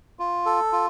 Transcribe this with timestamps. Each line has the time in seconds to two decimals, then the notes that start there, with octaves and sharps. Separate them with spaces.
0.19 F4
0.46 A4
0.72 F4